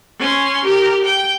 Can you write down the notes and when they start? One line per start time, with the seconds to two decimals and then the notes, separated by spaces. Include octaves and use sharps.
0.19 C#4 C6
0.65 G4 A#4
1.04 G5